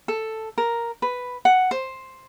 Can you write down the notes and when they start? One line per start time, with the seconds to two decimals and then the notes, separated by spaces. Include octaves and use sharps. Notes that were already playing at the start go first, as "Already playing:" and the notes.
0.08 A4
0.58 A#4
1.02 B4
1.45 F#5
1.71 C5